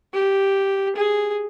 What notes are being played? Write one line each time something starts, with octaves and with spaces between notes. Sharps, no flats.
G4
G#4